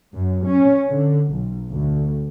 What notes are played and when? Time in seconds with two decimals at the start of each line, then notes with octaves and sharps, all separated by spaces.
0.15 F#2
0.47 C#4
0.89 D3
1.30 B1
1.70 D2